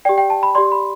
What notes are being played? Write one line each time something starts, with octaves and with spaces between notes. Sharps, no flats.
G4 D5 G5
G5
A5
B5
G4 D5 C6
B5